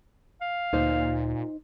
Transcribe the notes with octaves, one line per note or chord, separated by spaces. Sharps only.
F5
D2 A#2 D#4 C5